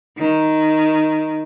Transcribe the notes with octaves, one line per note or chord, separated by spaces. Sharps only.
D#3